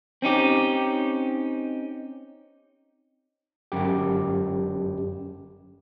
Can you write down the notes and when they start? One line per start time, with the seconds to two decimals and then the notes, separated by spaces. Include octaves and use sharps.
0.22 C4 C#4 D#4 G4
3.72 G1 F#2 G4